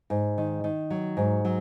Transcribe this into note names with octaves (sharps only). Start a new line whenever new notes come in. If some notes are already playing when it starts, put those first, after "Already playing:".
G#2
D#3
D#3
F#3
G#2
F#3